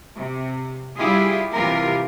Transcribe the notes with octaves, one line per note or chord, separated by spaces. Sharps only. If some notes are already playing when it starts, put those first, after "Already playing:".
C3
G3 E4 F4 G4 G#4
C3 E3 F4 G4 A#4